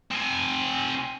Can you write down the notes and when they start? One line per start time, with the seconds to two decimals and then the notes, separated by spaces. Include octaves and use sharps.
0.12 C4 G#5